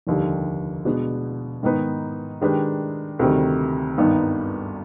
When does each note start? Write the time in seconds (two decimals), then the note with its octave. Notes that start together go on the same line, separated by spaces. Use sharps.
0.07 F1 D#2 D3 G3
0.85 B2 G#3 B3 D4
1.63 G#2 D#3 B3 D#4 B4
2.41 D#3 G#3 D4 G4 B4
3.19 D2 C3 D#3 G3
3.98 G#1 G2 D#3 B3 D#4